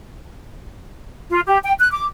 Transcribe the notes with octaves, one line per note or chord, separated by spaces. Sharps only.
F4
G4
G5
F#6
D6